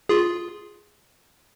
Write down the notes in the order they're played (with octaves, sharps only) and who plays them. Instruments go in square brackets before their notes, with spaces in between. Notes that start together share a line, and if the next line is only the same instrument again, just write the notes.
[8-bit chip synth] F4 G#4